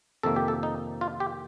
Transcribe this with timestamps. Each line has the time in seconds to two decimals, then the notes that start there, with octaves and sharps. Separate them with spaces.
0.23 F2 C3 D#3 A#3 A4
0.36 G4
0.48 A4
0.63 D#4
1.01 F4
1.20 G4